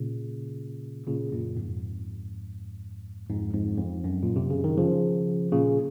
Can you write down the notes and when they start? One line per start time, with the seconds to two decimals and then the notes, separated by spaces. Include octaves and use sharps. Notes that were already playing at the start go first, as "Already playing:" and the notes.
Already playing: A#2 C#3
1.07 A#2 C#3
1.32 F#2 A#2
1.56 F2 G#2
3.29 F2 G#2
3.54 F2 G#2
3.78 F2
4.04 F#2
4.23 A#2
4.36 C3
4.50 C#3
4.64 D#3
4.77 C#3 F3
5.52 A#2 C#3